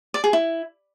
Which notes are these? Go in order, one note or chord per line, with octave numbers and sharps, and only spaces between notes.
D5
G#4
E4